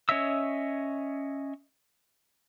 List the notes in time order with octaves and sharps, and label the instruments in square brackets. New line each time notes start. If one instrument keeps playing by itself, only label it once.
[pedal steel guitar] C#4 C#5 D#5 E5 E6